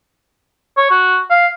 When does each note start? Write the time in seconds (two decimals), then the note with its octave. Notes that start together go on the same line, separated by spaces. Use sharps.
0.77 C#5
0.91 F#4
1.30 F5